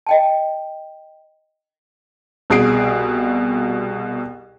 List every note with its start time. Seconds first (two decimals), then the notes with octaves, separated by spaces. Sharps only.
0.07 D#5 G5 A5
2.50 C2 B2 G#4 G#5 C7 D7